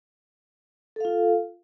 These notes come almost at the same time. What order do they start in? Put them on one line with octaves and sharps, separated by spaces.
A4 F5 F4